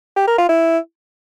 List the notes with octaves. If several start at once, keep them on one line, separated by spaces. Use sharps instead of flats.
G4
A#4
F4
E4